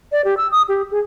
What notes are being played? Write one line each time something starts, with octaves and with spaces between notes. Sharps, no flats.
D5
G4
E6
D#6
G4
G#4